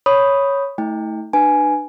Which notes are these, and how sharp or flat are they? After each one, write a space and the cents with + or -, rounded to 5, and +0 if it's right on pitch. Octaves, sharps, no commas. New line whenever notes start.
C#5 +0 B5 +0 D#6 +0
A3 +0 E4 -45 G5 +25
D4 +40 B4 +0 G#5 +5